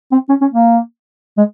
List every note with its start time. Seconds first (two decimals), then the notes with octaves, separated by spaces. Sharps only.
0.12 C4
0.29 C#4
0.41 C#4
0.53 A#3
1.38 G#3